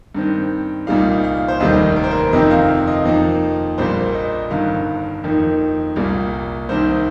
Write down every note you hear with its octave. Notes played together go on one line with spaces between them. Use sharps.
G2 D#3 C4
C2 A#2 G3 D#4 F5
F5
C5
F1 D#2 D#3 G3 A#3 D#5
A#4
C5
A#4
F2 C3 D#3 C4 D#5
F5
F5
D#5
F2 F3 A#3 D#4
A#1 A#2 G3 A#3 C5
D#5
G1 G2 D#3 F5
F2 D#3 A#3 D#4
C2 A#2 G3 A#3
C2 C3 D#3 C5